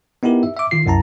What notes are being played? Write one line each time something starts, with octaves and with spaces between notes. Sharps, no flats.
B3 D#4 E4 G4 A#4
E5
E5 D6
D#3 F4 C7
C2 F#2 E4 A5 A#5